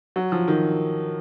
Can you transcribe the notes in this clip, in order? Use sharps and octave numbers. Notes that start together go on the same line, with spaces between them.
F#3
F3
D#3